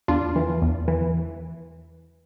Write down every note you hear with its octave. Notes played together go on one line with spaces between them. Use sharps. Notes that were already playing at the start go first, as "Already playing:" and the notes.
E2 D4 F4
E3
E2
E3